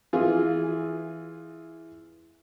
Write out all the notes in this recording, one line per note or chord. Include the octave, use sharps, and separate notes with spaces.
E3 F4 G#4